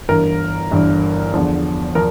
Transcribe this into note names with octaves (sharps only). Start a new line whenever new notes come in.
G1 G2 E3 A#4
G1 G2 E3
E2 D3 F3
F3 A#4